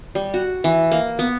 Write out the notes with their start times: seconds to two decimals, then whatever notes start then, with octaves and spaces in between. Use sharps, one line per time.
0.15 G3
0.34 F#4
0.64 E3
0.91 A#3
1.19 B3